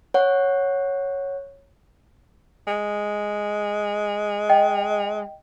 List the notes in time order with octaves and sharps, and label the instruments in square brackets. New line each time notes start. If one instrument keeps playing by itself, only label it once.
[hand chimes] C#5 F#5
[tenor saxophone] G#3
[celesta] D#5 G5